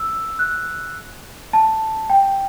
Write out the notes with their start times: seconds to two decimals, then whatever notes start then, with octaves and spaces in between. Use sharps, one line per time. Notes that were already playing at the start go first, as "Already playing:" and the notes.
Already playing: E6
0.39 F#6
1.53 A5
2.10 G5